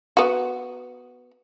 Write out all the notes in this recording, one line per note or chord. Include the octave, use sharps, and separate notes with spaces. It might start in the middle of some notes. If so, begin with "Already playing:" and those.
B3 F#4